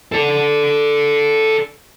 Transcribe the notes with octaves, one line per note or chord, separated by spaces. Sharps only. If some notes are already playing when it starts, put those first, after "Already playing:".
A4 D5